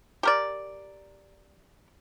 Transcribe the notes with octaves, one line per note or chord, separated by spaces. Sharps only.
G4 A#4 D5